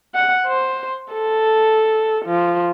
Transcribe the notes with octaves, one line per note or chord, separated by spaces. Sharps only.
F#5
C5
A4
F3